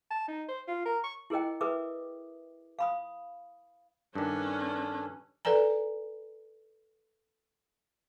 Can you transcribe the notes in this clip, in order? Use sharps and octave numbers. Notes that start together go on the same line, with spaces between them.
A5
D#4
C5
F4
A#4
C#6
E4 G#4 A#4 D#5 G5
G#4 A#4 B4 E5 D6 D#6
F5 B5 D#6
G2 D#3 C#4 D4 A4 B4
A4 B4 D5 G#5 A#5